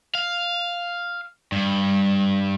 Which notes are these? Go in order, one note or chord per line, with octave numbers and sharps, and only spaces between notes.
F5
G2